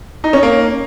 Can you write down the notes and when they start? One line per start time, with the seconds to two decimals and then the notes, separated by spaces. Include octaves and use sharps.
0.24 D#4
0.33 C#4
0.43 A#3